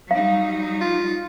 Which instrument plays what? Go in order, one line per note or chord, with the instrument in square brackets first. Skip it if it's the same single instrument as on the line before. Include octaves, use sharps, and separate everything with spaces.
[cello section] F#3 G3 D#4 [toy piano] F5
[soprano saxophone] F4